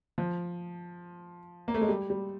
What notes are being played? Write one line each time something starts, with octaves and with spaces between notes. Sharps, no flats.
F3
A#3
A3
G#3
G3
G3